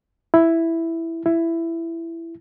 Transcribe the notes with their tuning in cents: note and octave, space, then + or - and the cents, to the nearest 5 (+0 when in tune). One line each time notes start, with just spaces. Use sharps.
E4 +0
E4 +10